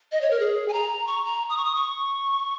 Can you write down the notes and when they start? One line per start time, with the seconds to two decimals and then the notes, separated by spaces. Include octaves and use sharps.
0.12 D#5
0.21 C#5
0.31 A#4
0.40 G#4
0.68 G#5
0.73 A#5
1.07 C#6
1.25 A#5
1.50 D#6
1.57 C#6
1.64 D#6
1.75 C#6